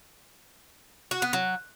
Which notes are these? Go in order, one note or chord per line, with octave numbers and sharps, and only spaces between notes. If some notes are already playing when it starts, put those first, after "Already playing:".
F#4
B3
F#3